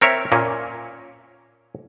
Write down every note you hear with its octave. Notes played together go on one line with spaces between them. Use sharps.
C4 A#4 C#5 E5
A#2 A#3 C#4